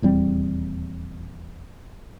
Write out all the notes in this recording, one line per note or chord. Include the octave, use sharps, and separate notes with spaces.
D#1 E2 G3 C4